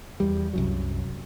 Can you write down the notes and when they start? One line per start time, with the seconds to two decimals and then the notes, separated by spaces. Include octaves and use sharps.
0.20 E2 G3
0.54 C2 F#2 F#3